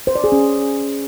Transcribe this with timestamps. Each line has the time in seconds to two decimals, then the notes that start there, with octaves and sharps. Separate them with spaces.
0.07 C5
0.15 D5
0.24 G#4
0.32 C#4